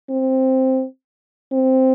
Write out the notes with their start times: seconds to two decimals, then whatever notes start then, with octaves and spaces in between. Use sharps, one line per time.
0.10 C4
1.53 C4